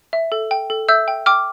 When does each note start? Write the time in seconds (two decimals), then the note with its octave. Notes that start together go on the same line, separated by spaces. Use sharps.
0.13 E5
0.32 A4
0.51 G5
0.70 A4
0.89 E5 E6 G6
1.08 G5
1.26 G5 D6 F6